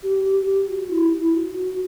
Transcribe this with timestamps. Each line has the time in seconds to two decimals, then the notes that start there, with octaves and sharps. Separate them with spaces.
0.03 G4
0.24 G4
0.46 G4
0.69 F#4
0.91 E4
1.12 E4
1.35 F#4
1.56 F#4